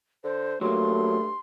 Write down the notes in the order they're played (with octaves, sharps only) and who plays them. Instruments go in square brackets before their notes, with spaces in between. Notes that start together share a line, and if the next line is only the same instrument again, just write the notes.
[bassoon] D3 [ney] C5
[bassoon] G2 [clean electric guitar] F#3 A#3 [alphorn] A3 [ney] C6